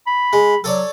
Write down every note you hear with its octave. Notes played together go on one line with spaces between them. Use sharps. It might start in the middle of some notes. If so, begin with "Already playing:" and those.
B5
G#3
F#3 A4 C#5 D5